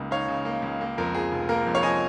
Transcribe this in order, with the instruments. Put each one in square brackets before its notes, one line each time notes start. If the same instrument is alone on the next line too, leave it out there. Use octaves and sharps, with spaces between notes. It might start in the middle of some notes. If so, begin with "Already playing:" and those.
Already playing: [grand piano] C#2 C#3 A#3 D#4
D#4 C#5 F5
C#3
A#3
C#2
A#3
F2 A#4
F3 G#4
F1
A#3 A#4
F2
C#5 F5
F3 D#5 G#5